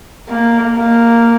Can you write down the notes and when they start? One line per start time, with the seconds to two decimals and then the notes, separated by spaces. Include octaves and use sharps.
0.29 A#3
0.76 A#3